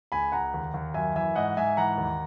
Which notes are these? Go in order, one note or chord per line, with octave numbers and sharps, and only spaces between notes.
C#2 G#5 B5
C#2 F#5 A#5
D#2
D#2
F#2 E5 G#5
E3 E5 G#5
G#2 D#5 F#5
G#2 E5 G#5
E3 F#5 A#5
D#2